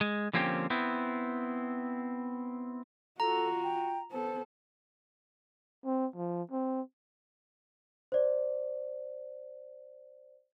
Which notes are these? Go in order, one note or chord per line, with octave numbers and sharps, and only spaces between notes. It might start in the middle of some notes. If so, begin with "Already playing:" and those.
G#3
D3 F3 A#3 C4 C#4 G4
B3 C4 E4
F4 F#4 A4 A#5
G5
B3 A4 C5
C4
F3
C4
C5 D5